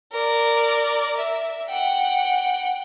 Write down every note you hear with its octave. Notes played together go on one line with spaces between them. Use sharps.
A#4 D5
E5
F#5 G5